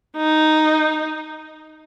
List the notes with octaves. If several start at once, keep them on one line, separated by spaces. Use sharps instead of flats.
D#4